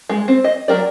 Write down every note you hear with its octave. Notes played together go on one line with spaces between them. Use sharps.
G#3
C4
D#5
F#3 C4 A#4 D5